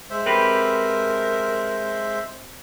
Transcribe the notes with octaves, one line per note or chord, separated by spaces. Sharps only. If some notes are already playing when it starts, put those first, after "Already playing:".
G#3 C5 E5
C4 G4 A#4 B4